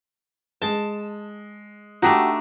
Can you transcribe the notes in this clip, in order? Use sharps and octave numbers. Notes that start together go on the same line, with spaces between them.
G#3 A5
A3 D4 D#4 F#4 G4 F#5